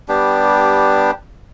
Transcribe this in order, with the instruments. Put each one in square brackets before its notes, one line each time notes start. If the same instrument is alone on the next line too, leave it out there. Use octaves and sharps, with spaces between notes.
[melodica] G3 B3 D4 G4